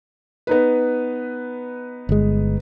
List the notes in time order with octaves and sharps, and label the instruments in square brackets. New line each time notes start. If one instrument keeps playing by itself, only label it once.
[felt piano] B3 D#4 B4
[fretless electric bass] G1 G#3